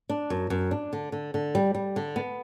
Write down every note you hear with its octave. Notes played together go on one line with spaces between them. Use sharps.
D4
F#2
F#2
D4
D3
D3
D3
G3
G3
D3
B3